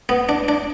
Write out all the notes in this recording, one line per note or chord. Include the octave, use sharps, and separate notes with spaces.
B3
D4
D4